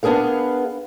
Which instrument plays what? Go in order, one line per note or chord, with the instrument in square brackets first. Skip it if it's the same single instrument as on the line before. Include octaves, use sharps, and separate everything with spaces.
[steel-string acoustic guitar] B3 D4 G#4 A#4 F5